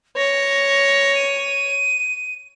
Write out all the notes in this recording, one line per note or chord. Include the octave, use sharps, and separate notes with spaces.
C#5 A#6
D#7